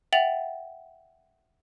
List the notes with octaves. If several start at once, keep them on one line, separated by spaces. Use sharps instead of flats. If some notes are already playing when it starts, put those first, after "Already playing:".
E5 F#5 G5 A6 F7 F#7